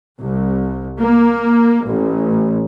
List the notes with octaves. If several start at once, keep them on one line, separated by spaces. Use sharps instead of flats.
C2
A#3
A1